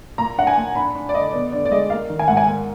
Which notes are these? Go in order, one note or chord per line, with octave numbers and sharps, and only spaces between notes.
A#2 A#5
D4 F#5
G#5
A#2
D4 B5
D4
D5
D3 D#5
B3 D5
D3 D5
D5
G#3 D#5
A#3 F5
D#3
G#5
G#2 F#5
G#5
A#3